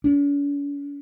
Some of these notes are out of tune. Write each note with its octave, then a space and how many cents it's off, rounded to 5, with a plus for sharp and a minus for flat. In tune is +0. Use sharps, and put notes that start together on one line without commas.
C#4 +45